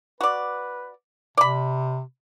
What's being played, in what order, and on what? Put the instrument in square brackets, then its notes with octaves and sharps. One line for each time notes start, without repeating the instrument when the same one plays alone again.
[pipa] F#4 D5 [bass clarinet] B4
[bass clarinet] C3 [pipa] D5 B5